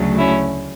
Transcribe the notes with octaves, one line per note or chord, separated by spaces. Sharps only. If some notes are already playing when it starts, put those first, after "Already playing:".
Already playing: D2 C#3 F#3 A3
C#4 E4